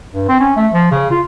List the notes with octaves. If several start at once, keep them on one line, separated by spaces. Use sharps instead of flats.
G2
C4
C#4
A3
F3
C#3
F4